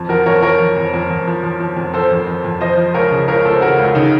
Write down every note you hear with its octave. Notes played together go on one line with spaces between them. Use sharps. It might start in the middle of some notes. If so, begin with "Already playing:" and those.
Already playing: F2
F3 F#4 A#4
F2 A#4 C#5
F3 A#4 C#5
F3
F2
F2
F2
F3
F3
F3
F2
F3 A4 C5
F2
F2
F2
F3 C5 D#5
F3
C#2 A#4 C#5
C#3
C#2 A#4 C#5
C#2 A4 C5
C#3 F#4 A#4
C#2
C#3 D#4